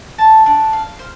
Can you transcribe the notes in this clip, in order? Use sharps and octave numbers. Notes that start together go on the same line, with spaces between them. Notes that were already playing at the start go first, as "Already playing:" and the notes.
A5
D4
F5
C5